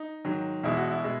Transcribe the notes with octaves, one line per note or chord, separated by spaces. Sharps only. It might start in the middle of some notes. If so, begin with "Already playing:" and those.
Already playing: D#4
G#2 D#3 F#3
E2 B2 G#3 E4
F#4
E4
B2 G#3